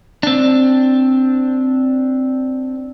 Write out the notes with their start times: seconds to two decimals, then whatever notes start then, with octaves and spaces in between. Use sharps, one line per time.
0.23 C4 D4